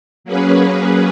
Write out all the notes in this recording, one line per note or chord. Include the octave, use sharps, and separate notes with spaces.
F#3 A#3 C#4 G#4 B4